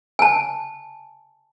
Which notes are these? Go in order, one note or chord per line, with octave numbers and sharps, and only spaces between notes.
G#5 A5